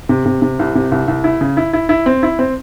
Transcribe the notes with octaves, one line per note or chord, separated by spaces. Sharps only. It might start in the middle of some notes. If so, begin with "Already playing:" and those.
C3
C3
C3
C2
C3
C2
C2
E4
C#3
E4
E4
E4
C4
E4
C4